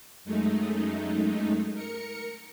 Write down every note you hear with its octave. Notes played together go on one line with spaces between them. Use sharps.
F#2 G#3 A3 D#4
A#4 C#7